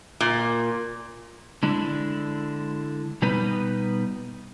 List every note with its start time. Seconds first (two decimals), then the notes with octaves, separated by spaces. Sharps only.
0.20 A#2
1.63 D3 G#3 D4 E4
3.22 B2 G3 B3 D#4 B4